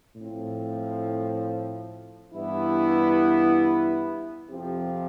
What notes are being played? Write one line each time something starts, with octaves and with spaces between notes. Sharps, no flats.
A2 F3 C4
G2 E3 B3 E4
F2 C3 F3 C4 G4